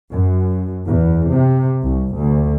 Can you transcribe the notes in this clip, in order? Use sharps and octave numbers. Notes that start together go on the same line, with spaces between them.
F#2
E2
C3
C2
D2